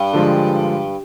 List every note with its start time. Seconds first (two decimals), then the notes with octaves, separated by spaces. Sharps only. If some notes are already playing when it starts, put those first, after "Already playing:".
Already playing: G2
0.13 D3 F3 G#3